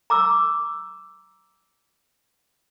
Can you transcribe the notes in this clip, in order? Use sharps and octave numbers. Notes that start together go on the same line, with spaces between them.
A#5 D6 E6